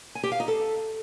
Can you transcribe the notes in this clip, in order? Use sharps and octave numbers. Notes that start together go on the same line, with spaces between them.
G#5
G4
F5
D#4
A4